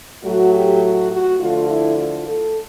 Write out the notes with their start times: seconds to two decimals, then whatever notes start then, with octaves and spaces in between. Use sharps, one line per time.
0.23 A2 F#3 A3 F#4
0.52 G4
0.82 F#4
1.11 F#4
1.39 D3 F3 A3 F4
1.68 E4
1.97 F4
2.26 A4